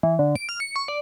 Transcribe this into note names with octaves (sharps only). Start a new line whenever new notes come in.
E3
D3
D7
F6
C#7
C#6
D5